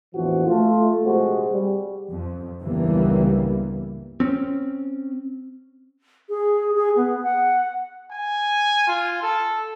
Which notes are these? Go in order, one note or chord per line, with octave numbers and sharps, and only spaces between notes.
A#1 E2 A2 E3 F3 F#4
A3 F4
A#1 C3 G#3 F#4 G#4 C5
G3
F2
C#2 G2 E3 G3 A#3 B3
C4 C#4
G#4
G#4
B3
F#5
G#5
F4
A4